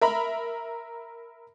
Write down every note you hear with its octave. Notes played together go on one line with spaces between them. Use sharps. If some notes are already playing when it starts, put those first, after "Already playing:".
A#4 E5 A#5 B5